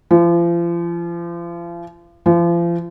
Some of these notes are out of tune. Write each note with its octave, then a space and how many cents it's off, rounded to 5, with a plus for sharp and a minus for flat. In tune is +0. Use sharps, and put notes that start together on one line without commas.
F3 -35
F3 -35